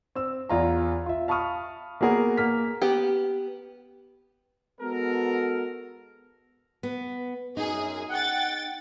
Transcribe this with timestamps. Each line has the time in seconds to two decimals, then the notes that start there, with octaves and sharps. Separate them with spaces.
0.15 C4 E6
0.49 E2 F4 A#5
1.06 F4 E5
1.28 F5 A5 B5 C#6 D#6 F6
2.01 A#3 B3 F#4 G#4 A#4 F#5
2.37 A#3 F6 B6
2.82 B3 G4
4.81 G#3 B3 F#4 A4 A#4
6.83 B3
7.57 F#2 D#4 G#4
8.10 F#5 G5 A6